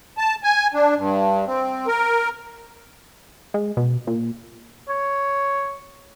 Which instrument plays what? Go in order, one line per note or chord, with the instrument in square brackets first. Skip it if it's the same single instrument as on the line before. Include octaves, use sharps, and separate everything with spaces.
[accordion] A5
G#5
D4
G2
C4
A#4
[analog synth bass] G#3
B2
A#2
[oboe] C#5